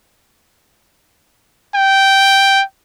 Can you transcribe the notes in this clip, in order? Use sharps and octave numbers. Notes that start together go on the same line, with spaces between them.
G5